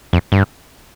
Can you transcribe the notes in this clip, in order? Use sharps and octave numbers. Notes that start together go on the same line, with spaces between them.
F2
G2